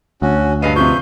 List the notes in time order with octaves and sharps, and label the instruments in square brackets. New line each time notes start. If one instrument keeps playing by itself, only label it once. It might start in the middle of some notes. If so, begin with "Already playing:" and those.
[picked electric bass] D2 [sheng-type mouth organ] C#4 F#4
[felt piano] G2 C7 D#7 [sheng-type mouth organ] B4 D#5 F5
[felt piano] C3 F3 [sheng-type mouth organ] B4 G6 [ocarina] C#6